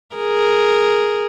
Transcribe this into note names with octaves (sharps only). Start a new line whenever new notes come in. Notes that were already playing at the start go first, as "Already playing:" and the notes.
G#4 A#4